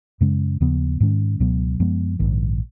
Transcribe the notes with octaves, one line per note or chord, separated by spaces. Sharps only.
F#2 C#3 G#3 C#4
D#2 C#3 F3 B3
G#2 D#3 G#3 C#4
C#2 B2 F#3 B3
F#2 F3 G#3 B3
A#1 G#2 D#3